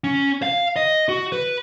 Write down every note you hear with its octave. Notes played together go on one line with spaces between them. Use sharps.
C#4
F5
D#5
F#4
B4